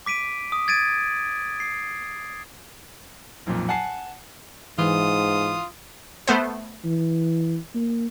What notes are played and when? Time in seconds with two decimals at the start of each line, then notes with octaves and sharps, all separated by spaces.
0.06 D6 B6 D7 D#7
0.52 D#6
0.68 G#6 A6 D7 D#7
1.60 C7
3.46 B1 F2 A#2
3.69 F#5 G#5 A5 C7
4.78 G#2 E3 F4 D#6
6.28 A3 B3 C5
6.85 E3
7.75 A#3